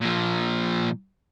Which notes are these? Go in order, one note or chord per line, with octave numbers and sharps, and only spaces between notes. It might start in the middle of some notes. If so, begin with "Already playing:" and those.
A#2 F3